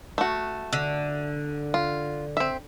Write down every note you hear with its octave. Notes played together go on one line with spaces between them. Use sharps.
A3 F#4
D3
F4
C4 E5